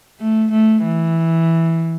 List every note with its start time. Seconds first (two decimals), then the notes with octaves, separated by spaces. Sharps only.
0.21 A3
0.52 A3
0.84 E3